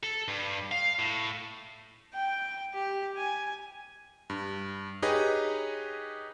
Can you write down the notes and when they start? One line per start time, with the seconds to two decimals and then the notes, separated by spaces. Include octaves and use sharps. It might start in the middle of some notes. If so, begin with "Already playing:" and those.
0.03 A4
0.28 G2
0.72 F5
0.99 A2
2.13 G5
2.74 G4
3.17 G#5
4.30 G2
5.02 D#4 G4 G#4 B4 C#5 D#5